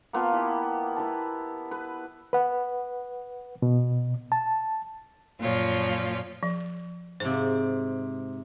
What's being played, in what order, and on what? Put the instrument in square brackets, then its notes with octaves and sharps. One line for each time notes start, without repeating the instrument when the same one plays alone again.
[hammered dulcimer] A#3 B3 F4 A5
E4 G4
E4 B4 A5
B4
[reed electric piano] B4 F#5
B2
A5
[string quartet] F#2 A#2 F3 F4 C#5
[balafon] F3
[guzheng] G#2 C3 [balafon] C5